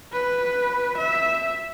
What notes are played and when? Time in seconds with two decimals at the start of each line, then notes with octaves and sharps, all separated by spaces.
0.13 B4
0.98 E5